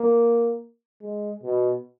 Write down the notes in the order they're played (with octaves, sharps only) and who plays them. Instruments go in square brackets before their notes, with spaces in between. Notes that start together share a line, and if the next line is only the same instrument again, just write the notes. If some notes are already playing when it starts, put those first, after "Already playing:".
Already playing: [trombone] A#3
G#3
B2